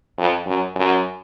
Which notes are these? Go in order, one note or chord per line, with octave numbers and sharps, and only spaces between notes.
F2
F#2
F#2